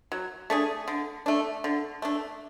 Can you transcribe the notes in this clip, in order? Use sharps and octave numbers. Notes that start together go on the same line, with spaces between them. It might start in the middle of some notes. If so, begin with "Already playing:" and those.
F#3
A3 D4 G#4
D3
A3 D4
D3
A3 D4